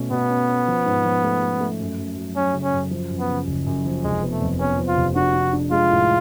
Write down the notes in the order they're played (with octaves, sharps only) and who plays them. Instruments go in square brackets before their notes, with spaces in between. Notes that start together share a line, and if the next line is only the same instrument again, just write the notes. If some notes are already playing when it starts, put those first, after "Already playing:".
Already playing: [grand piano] B2 A3 C#4
[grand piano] B2 [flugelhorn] B3
[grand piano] C#4
C#4
F3
G#2
F3
A3
A3
A3
F#2
F#2
F#3
[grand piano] F#3 [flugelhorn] C#4
[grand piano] C#3
[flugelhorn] C#4
[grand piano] F#2
F3
F#2
[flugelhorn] B3
[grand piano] C#3
F#1
F#2
F3
[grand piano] F1 [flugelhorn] G#3
[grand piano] B3
[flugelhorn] A3
[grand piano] F2
[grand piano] B3 [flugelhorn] C#4
[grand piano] F3
[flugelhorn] F4
[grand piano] F1
[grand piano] D4 [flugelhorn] F#4
[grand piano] D4
D4
[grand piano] G#3 [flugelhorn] F4
[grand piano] A2